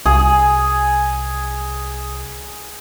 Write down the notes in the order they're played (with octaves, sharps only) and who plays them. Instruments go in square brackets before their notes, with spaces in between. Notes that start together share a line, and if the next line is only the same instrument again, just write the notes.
[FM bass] C2 [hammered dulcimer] G#4